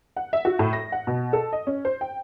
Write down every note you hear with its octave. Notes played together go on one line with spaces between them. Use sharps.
F#5
E5
F#4
A2
A#6
F#5
B2
A4
D#5
C#4
C5
G5